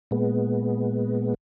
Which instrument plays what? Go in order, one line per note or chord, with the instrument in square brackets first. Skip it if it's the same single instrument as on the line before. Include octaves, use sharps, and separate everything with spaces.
[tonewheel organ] A#2 G#3 B3